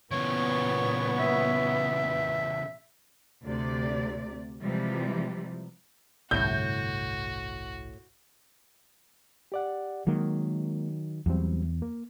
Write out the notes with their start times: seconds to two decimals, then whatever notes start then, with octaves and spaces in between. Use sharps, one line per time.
0.11 A#2 C#3 E3 B3 C#5
1.19 E5
3.44 D2 C3 D5
4.60 C3 E3 F3 G3 G#3
6.31 G1 C2 A2 E4 F#4 G6
9.52 G4 D5 F#5
10.07 D#3 F#3 G#3 A#3
11.26 E2 F#3 G3 C4
11.82 A#3